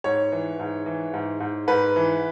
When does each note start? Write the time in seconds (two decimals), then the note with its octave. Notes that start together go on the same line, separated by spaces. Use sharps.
0.04 G#2 C#5
0.32 E3
0.59 G#2
0.86 E3
1.14 G#2
1.40 G#2
1.68 G#2 B4
1.96 E3